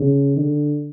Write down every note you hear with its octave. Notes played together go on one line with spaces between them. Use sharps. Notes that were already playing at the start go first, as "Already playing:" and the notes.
Already playing: C#3
D3